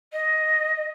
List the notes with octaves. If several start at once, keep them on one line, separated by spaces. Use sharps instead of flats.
D#5